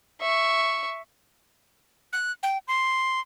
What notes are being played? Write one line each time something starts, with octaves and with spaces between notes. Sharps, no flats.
E5 C#6
F#6
G5
C6